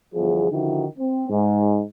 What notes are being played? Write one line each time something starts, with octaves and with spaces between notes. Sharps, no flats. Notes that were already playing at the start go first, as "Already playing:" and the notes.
G1 E2 F3 G#4
D3 D#3 F3 D#4 E4 F#4
C4
G#2